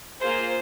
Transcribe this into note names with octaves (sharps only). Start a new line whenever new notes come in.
A#3 F4 G#4 C5